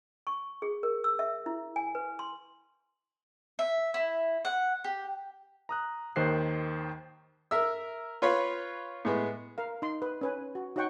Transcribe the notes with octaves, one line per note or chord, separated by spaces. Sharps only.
C#6
G#4
A#4
E6
E5
E4
G#5
B4
C6
E5
E4
F#5
G4
A#5 D#6 F#6
D#2 D#3 C5 F#6 C7
A#4 E5 E6
F4 B4 C#5 B5 C6
A2 G#3 B3
A#4 F5
D#4 C6
B4
C#4 B4 G#5
F#4
D#4 F#4 C#5 F#5 G5 C#6